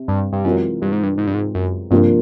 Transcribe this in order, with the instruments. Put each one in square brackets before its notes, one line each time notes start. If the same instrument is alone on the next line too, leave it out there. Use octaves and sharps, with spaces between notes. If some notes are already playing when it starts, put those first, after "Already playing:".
Already playing: [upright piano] C3
[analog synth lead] G2
G2
[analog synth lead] F#2 [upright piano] E3 G#3 C4 F4 A#4
[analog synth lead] G2
G#2
G2
G#2
G2
G#2
F#2
[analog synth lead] G2 [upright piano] C3 F3 A#3 D4